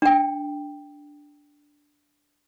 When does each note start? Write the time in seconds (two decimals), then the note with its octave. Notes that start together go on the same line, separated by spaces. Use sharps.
0.02 D4 G5